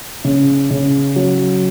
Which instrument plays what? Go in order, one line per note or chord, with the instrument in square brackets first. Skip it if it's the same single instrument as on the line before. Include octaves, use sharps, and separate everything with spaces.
[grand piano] C#3
C#3
F#3